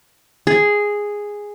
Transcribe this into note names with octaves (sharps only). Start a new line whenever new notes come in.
G#4